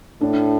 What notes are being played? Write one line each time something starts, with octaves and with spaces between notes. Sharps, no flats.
A2 D4